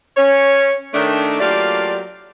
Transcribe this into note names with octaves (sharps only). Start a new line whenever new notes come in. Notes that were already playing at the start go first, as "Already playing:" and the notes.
C#4 C#5
D#3 A3 D4
F#3 A3 A#3 F4 G4 D5